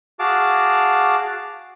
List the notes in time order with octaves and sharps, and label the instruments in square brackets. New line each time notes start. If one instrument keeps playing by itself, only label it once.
[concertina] F#4 G#4 F5 A5 D6